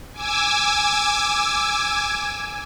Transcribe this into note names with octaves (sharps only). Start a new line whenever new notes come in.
G#5 D6 E6